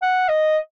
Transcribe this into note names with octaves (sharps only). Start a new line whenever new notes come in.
F#5
D#5